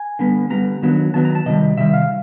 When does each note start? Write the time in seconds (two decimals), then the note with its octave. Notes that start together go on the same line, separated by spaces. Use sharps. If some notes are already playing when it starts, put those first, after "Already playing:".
Already playing: G#5
0.19 D3 G3 B3
0.50 D3 G3 B3 A#5
0.82 D#3 F#3 B3 D4
1.14 D#3 F#3 B3 D4 A5
1.25 A#5
1.35 A5
1.46 C3 D#3 G3 D#5
1.77 C3 D#3 G3 E5
1.93 F5